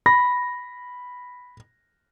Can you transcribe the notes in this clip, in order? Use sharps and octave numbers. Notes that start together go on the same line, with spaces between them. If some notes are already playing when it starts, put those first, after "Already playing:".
B5 A#6